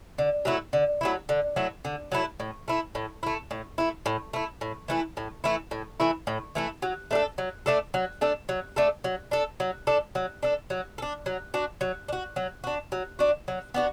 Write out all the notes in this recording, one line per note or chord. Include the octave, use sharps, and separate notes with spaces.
D3
F#3 A3 E4
D3
F#3 A3 E4
D3
F#3 A3 E4
D3
F#3 A3 E4
A2
A3 E4
A2
A3 E4
A2
A3 E4
A2
A3 E4
A2
E3 A3 E4
A2
E3 A3 E4
A2
E3 A3 E4
A2
E3 A3 E4
F#3
A3 D4 A4
F#3
A3 D4 A4
F#3
A3 D4 A4
F#3
A3 D4 A4
F#3
D4 A4
F#3
D4 A4
F#3
D4 A4
F#3
A4
D4
F#3
D4 F#4
F#3
D4
F#4
F#3
D4 F#4
F#3
D4 F#4
F#3
B3 D4 F#4